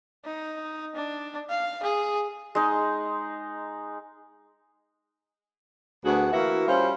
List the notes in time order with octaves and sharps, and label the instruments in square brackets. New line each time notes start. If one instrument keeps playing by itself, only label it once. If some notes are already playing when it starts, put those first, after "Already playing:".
[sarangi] D#4
D4
F5
G#4
[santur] G#3 D#4
[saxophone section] D2 B3 F#4 G#4
E3 A#3 F#4 E5
G3 C#4 F4 C5